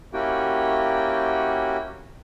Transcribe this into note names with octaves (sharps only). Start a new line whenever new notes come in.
A#3 C#4 E4 F#4 G4 G5